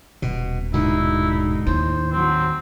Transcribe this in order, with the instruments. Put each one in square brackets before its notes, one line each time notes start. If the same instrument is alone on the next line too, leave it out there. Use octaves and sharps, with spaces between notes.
[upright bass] D#1 [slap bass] B2
[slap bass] G#2 B2 D3 [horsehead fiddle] D#4 [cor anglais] E4
[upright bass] D#2 [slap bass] A2 [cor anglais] C5
[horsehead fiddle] F#3 C5 [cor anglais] C4